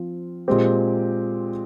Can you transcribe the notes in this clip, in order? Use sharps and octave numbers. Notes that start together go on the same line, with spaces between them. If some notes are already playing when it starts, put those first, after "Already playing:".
Already playing: F3 C4 F4
A#2 G#3 C4 G4